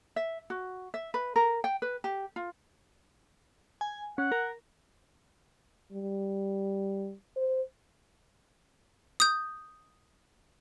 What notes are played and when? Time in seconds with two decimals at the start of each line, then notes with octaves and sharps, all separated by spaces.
0.16 E5
0.50 F#4
0.94 E5
1.14 B4
1.36 A#4
1.64 G5
1.82 B4
2.04 G4
2.36 F4
3.81 G#5
4.18 C#4 F#5
4.32 A#4
5.92 G3
7.36 C5
9.20 D#6 G6